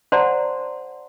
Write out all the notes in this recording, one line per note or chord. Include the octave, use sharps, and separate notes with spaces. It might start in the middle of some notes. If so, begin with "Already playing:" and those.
C5 D5 F#5 A5 A#5 C6